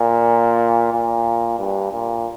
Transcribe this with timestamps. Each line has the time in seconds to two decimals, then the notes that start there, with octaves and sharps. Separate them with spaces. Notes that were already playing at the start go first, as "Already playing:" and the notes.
Already playing: A#2
0.93 A#2
1.59 G2
1.92 A#2